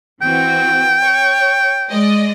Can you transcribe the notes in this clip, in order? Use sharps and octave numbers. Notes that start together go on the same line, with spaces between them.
E3 C4 F#4 G5
C#5
G#3 D5 D#5